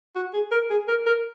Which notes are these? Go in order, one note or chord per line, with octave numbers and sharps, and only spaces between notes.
F#4
G#4
A#4
G#4
A#4
A#4